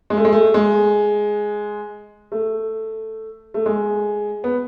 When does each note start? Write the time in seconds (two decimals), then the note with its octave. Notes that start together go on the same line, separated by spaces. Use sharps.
0.10 G#3
0.17 A3
0.25 G#3
0.32 A3
0.54 G#3
2.32 A3
3.54 A3
3.66 G#3
4.44 B3